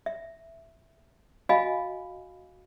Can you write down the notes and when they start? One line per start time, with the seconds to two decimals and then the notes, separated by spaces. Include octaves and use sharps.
0.06 E5
1.49 F#4 D#5 F5 G#5 B5